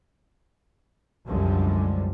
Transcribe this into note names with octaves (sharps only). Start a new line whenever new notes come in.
C2 F#2 D3 F3 G3 G#3